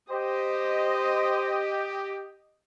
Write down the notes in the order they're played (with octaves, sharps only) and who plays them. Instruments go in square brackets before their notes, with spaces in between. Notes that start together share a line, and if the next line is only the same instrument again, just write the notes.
[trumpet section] G4 [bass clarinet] C5 [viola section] D#5